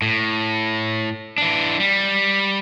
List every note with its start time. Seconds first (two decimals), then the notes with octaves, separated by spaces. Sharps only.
0.02 A2
1.38 E3 D4
1.80 G3